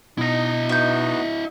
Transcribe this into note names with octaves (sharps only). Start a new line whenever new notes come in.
B2 D#4 E4 D#5
B3 D#4 F#4 E5 G6